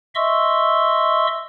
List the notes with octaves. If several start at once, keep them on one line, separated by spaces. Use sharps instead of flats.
D#5 E5 C6 C#6 E6